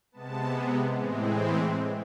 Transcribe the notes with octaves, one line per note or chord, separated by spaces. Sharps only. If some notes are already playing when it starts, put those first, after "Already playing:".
C3 G#3 B3 A5
A2 E3 G#3 C4
B5